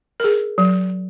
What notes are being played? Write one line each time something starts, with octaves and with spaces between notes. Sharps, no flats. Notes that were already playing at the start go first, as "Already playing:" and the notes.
G#4 A#4
F#3